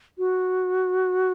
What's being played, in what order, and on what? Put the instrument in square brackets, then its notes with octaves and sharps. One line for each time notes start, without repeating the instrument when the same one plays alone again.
[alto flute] F#4